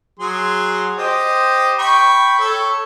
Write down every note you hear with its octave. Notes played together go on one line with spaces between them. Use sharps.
F#3 G#4 C6
G4 C5 D#5
G5 B5 C#6
A4 C#5